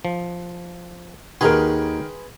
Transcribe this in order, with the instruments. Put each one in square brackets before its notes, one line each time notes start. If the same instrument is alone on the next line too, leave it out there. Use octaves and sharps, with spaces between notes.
[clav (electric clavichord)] F3
[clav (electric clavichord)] D#2 D#4 F#4 [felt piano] D#3 A#4 [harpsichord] G#4 B4 C6